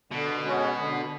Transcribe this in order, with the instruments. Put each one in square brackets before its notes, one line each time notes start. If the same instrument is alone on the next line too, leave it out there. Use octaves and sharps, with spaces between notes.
[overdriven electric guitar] B2 [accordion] D3
[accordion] G#3 C#4 F#4
D3